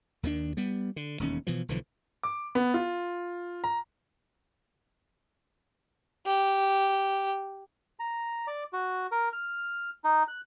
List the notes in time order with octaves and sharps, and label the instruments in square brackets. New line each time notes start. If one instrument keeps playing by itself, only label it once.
[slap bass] D#2 D#3 G#3 D4
G3 B3
D3
E1 D#2 C#4
B2 E3 F3
B1 D3 E3 F3
[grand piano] D6
B3
F4
A#5
[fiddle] G4
[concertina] A#5
D5
F#4
A#4
F6
D#4
F#6